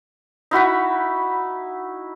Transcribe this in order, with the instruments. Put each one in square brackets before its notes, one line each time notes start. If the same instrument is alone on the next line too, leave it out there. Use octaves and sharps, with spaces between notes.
[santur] D#4 E4 F#4 B5